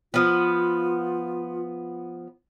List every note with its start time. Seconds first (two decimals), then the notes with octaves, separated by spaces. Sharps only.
0.14 F3 B3 F4